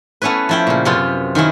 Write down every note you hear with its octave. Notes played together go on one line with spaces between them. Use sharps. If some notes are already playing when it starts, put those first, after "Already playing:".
A3 B3 C#4 E4 B4
F3 E4 G5
A#2 C#3
F#2 C3 B3 F4
D#3 F#3 C#4 E4